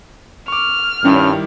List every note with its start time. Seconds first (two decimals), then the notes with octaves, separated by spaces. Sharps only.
0.48 C#6 D6 F6
1.05 G2 D#3 G3 C#4 E4